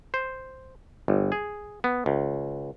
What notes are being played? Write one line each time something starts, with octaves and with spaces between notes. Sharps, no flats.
C5
G1
G#4
B3
C#2